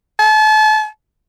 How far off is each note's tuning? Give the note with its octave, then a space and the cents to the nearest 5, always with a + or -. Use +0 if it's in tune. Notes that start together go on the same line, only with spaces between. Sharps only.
A5 -35